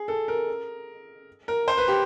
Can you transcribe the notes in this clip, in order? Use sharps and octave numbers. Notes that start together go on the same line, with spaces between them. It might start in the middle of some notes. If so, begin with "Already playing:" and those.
Already playing: G#4
A4
A#4
A#4
C5
B4
G4